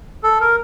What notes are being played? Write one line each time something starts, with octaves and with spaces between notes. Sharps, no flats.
A4
A#4